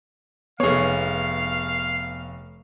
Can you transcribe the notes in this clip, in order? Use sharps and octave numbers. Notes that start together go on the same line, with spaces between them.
F1 B3 G#4 C#5 F5